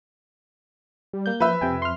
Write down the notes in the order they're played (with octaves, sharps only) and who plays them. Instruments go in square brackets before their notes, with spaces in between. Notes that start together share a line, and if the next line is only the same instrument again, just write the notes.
[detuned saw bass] G3
[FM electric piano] A#3 G6
[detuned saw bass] F3 [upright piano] B4 E5
[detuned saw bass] F2 [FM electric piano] C3 G5 G#5
[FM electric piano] C6 F6